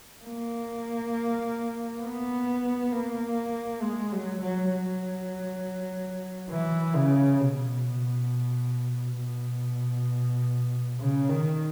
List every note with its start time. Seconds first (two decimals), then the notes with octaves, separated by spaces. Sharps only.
0.24 A#3
2.02 B3
2.92 A#3
3.82 G#3
4.12 F#3
4.42 F#3
4.72 F#3
6.50 E3
6.96 C#3
7.41 B2
9.20 B2
10.99 C#3
11.29 D#3